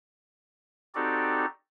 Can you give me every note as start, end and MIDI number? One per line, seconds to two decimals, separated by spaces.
0.95 1.45 60
0.95 1.45 63
0.95 1.45 66
0.95 1.45 67
0.95 1.45 69
0.95 1.45 74